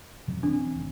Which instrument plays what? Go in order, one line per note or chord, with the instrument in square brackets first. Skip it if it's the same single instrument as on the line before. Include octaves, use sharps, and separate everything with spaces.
[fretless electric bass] F2 B2 F#3
[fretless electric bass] E3 C4 [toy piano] D4
[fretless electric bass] D1 A#1 D#2